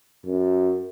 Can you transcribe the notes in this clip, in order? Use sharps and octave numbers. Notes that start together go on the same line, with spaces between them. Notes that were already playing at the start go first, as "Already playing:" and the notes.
F#2